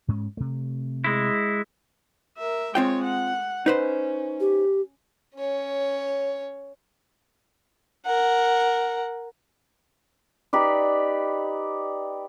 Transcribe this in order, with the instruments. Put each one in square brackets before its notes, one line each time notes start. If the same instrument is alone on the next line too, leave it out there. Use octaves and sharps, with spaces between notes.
[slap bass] G#2 G#3 C#4
C3 A3
[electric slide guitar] G#3 E4
[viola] A#4 E5
[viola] G#3 C#5 [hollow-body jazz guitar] C4 F4 G5
[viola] F#5
[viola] C#4 [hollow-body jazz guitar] D#4 B4 C5
[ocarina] G4
[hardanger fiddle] C#4 C#5
A#4 F#5
[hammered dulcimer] D#4 G4 B4 D5